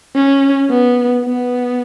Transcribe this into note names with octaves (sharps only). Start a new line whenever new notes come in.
C#4
B3
B3